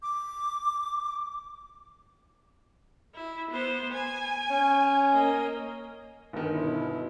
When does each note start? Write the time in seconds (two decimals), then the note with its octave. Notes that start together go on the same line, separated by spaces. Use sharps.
0.02 D6
3.15 E4
3.51 B3 C5
3.93 G#5
4.50 C#4 C#5
5.13 A#3 D#5
6.33 G1 D#3
6.52 B2 E4